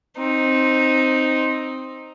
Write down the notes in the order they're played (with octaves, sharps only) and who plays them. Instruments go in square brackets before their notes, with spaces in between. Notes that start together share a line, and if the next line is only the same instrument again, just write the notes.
[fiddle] C4 D#4